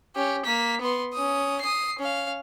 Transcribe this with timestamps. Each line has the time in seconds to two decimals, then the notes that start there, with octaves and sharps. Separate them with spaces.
0.15 C#4 G4
0.45 A#3 B6
0.81 B3 C6
1.14 C#4 D#6
1.61 D#6 C7
1.99 C#4 F5